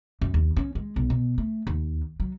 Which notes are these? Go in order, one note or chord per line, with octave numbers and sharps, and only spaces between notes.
F#2
D#2
C#4
G#3
B1
B2
A3
D#2
F#3